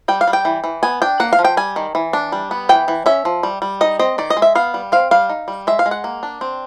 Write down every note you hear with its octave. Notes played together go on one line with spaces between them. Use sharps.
G3 G5
F5
G3
G5
E3
E3
B3 G#5
D4 G5
A#3 F#5
F5
F3
G5
G3 G#5
D#3
E3
D4
G3
B3
E3 G5
E3
C#4 E5
F3
G3
G3
D#4 D#5
C4 D#5
D#3 D5
D#5
G#3
E5
B3 F5
G3
C4 F5
G3 F5
D#4
G3
G#3 E5
F5
G#3
F#5
A#3
D4
C4